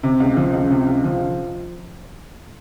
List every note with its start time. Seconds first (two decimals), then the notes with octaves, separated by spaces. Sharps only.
0.03 C3
0.20 C#2
0.37 F3
0.53 C#2
0.70 C3
0.87 C#2
1.04 F3